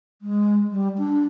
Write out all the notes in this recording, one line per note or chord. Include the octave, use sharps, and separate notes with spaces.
G#3
G3
D4